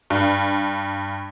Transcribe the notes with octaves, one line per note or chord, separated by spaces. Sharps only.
G2